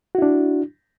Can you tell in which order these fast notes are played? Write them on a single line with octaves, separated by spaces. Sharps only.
F#4 E4 D4